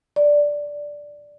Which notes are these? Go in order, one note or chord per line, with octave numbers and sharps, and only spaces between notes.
D5